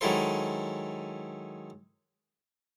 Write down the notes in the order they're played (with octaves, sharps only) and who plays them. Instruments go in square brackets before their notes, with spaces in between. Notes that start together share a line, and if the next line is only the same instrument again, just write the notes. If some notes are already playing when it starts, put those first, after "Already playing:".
[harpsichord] D#3 F#3 G#3 E4 A4 C5